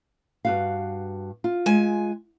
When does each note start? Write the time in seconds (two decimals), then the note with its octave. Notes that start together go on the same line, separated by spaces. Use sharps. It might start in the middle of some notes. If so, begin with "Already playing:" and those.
0.45 G2 F#4 F5
1.44 F4
1.66 G#3 G#5